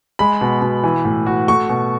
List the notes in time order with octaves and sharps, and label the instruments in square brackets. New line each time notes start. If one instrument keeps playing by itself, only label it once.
[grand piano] G#3 [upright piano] B5
[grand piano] B2
B2
E3
A2
F#4
[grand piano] A3 [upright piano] C#6
[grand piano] B2